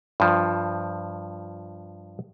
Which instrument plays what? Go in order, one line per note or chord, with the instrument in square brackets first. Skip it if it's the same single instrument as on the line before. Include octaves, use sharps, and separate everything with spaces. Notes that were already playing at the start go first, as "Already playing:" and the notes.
[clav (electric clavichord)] G2 F3